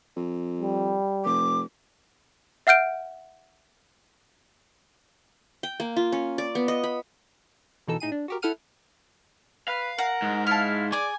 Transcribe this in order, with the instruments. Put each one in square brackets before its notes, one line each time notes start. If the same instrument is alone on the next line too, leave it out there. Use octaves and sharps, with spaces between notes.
[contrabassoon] F2
[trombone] G3
[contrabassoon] F1 [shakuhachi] D6
[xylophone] E5 F#5 F6 G6 D7
[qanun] G5
A#3
F4
C#4
D5
B3
D#5
B5
[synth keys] B2 E3 D#4 A4 E6
A2 D#4 G#4 D#7
D4
F#4 G4 A#4
E4 A4 F#5 F6 D#7
[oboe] B4 [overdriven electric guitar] F5
[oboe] A#4 [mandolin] F#5
[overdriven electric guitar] G#2
[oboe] E4 [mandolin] F5 A5
[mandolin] G#4 D6 [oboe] D5 [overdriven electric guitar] G#5